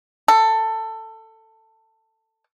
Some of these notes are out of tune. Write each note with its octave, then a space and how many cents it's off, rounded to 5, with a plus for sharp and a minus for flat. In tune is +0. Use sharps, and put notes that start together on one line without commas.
A4 +15